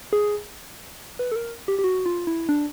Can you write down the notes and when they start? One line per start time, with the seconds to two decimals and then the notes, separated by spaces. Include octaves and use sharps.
0.13 G#4
1.19 B4
1.32 A4
1.36 A#4
1.68 G4
1.79 G4
1.84 F#4
2.06 F4
2.27 E4
2.49 D4